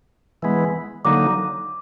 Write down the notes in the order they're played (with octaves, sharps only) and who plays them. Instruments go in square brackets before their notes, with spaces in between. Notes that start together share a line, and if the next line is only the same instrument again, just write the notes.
[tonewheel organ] E3 G#3 B3
[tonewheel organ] D3 F#3 A#3 D#4 [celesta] D6